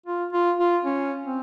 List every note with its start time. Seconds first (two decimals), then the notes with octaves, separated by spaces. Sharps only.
0.06 F4
0.33 F4
0.59 F4
0.85 C#4
1.25 C4